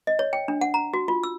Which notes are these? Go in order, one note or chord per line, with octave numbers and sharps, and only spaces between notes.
D#5
C#5
G5
D4
F#5
A#5
F#4
F4
E6